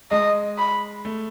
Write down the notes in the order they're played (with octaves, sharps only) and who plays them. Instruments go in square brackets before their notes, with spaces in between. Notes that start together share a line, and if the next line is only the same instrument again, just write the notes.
[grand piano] G#3 [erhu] D#5
[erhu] B5
[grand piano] A3